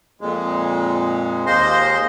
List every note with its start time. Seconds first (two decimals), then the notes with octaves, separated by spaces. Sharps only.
0.21 F2 A#2 G#3
1.46 D#2 G#3 A#3 C5 D#5 C6